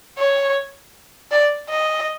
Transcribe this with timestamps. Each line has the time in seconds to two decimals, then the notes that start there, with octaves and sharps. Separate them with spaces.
0.18 C#5
1.31 D5
1.69 D#5